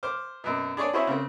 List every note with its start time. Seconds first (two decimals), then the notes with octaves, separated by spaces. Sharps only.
0.03 C5 D6 F6
0.44 F#2 B2
0.77 D4 G#4 C#5 D5
0.93 E4 F#4 G#4 C5 C#5 E5
1.07 C#3 C4